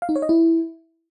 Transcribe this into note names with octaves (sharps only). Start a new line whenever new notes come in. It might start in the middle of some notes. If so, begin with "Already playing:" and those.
F5
D#4
C#5
D#5
E4